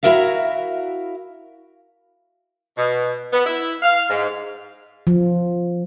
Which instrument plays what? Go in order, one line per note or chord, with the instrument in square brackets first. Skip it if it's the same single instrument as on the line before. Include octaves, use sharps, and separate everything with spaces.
[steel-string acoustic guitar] E4 F#4 A#4 E5 F5
[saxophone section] B2
B3
E4
F5
G#2
[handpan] F3